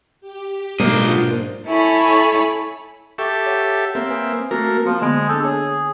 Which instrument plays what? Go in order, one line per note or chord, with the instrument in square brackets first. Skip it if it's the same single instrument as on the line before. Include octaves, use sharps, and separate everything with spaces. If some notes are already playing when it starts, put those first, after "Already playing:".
[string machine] G4
[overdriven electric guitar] B1 D#5 [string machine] G#2 F4 [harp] A#3 [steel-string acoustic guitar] D4 A#4 C5
[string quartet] E4 A4 C#5 G#5 B5
[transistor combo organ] G4 A4 E5 [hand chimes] C#6 D6
[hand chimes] C#5 F#5
[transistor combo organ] A#3 C4 E5
[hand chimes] B4 G#5 D#6
[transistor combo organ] A3 A#3 A#4 [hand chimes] C4 F#4
[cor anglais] F3 [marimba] A#3
[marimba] D3 B3 [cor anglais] G#3
[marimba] D4 G6 [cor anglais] A4
[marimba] D4 C#5 [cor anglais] G#4